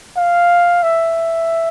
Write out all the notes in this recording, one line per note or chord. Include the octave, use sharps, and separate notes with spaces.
F5
E5